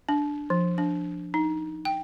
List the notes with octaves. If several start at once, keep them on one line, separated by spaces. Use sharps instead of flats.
D4
F3
D4
D#4
G5